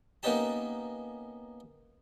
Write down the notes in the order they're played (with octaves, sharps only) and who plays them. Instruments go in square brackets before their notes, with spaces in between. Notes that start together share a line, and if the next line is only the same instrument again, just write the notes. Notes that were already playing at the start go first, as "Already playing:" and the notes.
[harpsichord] A#3 B3 C#4 D#4 G4 A5